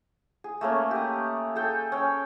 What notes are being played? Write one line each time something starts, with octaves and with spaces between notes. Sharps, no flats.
G#4
A3 A#3 C#4
G4 D#5
G#4 A4 G5
C#4 G5